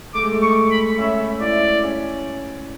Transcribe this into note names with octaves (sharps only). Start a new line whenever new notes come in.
A3 D6
G#3
A3
C#6
B5
C#4 E5
E4 D5
C#4